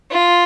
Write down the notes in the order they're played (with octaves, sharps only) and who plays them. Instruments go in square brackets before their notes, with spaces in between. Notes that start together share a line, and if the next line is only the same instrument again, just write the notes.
[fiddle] F4